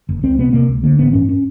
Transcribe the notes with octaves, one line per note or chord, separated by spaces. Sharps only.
F#1
C#2 C4
C3 B3
C3 A#3
C#2
D3 A#3
A1 B3
G2 C#4
C#4